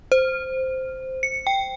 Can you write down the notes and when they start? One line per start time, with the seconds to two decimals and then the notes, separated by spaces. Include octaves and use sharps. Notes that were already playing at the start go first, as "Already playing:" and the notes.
0.12 C5
1.23 C#7
1.47 G5